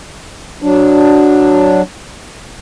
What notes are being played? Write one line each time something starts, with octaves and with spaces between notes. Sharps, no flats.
F#3 D4